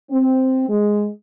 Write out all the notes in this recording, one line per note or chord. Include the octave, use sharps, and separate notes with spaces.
C4
G#3